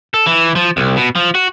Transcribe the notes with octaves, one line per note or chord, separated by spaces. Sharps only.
A4
E3
F3
C2
B2
F3
F#4